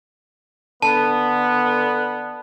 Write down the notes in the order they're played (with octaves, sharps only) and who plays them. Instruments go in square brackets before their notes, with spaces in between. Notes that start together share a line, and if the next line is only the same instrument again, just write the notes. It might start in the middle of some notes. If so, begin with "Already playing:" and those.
[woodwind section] D3 B3 [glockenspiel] A5